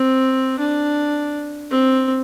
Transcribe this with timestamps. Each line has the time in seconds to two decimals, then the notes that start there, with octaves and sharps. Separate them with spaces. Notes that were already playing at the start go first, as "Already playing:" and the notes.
Already playing: C4
0.59 D4
1.71 C4